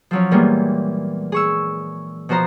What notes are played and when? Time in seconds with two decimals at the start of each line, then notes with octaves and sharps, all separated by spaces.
0.11 F3 F#3 C#4
0.31 A#2 E3 G3 G#3 A#3 B3
1.32 G#4 C#6 E6
2.29 B2 F3 F#4 C5 A#5